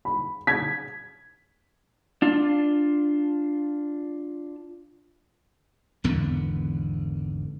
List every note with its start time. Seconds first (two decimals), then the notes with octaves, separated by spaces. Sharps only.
0.05 B5
0.47 G#6 B6
2.22 D4 F4
6.04 G#1 E2 D3 B3